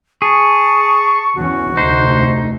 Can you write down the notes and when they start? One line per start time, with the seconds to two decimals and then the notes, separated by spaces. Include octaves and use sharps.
0.22 G#4 A5 C#6
1.35 E2 E3 C#4 F#4
1.77 F1 D2 A3 D#4 C5